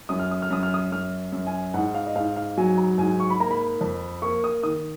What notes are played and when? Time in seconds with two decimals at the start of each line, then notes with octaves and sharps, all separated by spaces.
0.09 F#2 D#6
0.19 F6
0.31 D#6
0.42 F6
0.50 F#2 D#6
0.63 F6
0.74 D#6
0.92 F#2 F6
1.33 F#2
1.47 G#5
1.74 G#2 F#5
1.95 F5
2.07 D#5
2.16 G#2 F5
2.36 F5
2.57 F#3 G#5
2.78 A#5
2.98 G#2 G#5
3.20 C#6
3.30 B5
3.40 A#3 A#5
3.51 B5
3.81 F2
4.22 A#3 C#6
4.44 D#6
4.63 D#3 D#6